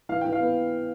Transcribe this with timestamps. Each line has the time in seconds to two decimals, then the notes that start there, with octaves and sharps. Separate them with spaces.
0.09 E3 F5
0.21 E3 G5
0.33 F5
0.40 B3